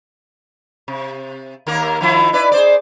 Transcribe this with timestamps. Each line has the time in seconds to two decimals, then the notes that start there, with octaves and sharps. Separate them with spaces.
0.88 C3
1.67 D#2 A#3 A#4
2.01 D#3 F3 E4
2.33 E4 B4 D5
2.52 G#4 C5 D5